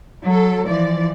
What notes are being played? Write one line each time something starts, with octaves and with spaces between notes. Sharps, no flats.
F#3 A4
E3 F3 D5